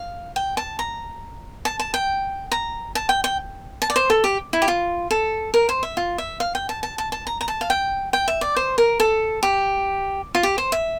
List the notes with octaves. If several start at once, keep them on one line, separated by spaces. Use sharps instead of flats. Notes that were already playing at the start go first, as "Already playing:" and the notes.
Already playing: F5
G5
A5
A#5
A5
A5
G5
A#5
A5
G5
G5
A5
D5
C5
A4
G4
E4
G4
F4
A4
A#4
C5
E5
F4
E5
F5
G5
A5
A5
A5
A5
A#5
A#5
A5
F5
G5
G5
E5
D5
C5
A#4
A4
G4
F4
G4
C5
E5